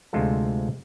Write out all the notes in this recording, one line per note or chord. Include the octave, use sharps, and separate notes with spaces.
D2 C3 F3 G#3 F4 A4